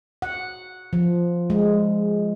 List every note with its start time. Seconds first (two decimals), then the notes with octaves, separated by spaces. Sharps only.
0.22 F#5
0.93 F3
1.50 G#3